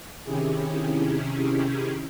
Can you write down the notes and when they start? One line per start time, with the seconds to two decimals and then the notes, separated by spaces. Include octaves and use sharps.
0.24 C3 D#3 C#4 E4 G4 G#4